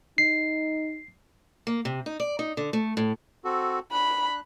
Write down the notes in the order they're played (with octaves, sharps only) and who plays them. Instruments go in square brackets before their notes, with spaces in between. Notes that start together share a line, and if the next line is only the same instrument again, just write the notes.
[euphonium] D#4 [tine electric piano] C7
[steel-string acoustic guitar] A#3
C3
D#4
D5
D#4
D3
A3
A2
[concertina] C4 F#4 A4
[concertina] D4 F#6 [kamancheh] B5